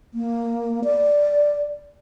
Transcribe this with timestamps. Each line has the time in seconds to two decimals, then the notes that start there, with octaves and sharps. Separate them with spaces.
0.14 A#3
0.84 D5